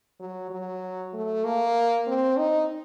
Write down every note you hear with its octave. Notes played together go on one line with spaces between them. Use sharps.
F#3
F#3
A3
A#3
C4
D#4